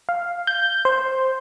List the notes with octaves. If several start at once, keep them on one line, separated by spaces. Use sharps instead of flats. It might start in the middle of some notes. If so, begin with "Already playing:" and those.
F5
G6
C5